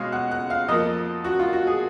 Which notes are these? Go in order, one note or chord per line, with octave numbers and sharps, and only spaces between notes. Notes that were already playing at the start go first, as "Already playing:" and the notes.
Already playing: B2 G#3 C#5 F5
F#5
F#5
F5
F2 F3 A#3 D#5
F#4
F4
F#4
G#4